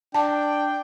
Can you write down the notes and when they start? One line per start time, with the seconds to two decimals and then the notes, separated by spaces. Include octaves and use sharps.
0.14 D4 G5 A5